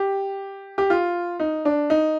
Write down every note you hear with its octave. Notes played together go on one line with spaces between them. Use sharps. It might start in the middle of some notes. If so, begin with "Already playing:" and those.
Already playing: G4
G4
F4
D#4
D4
D#4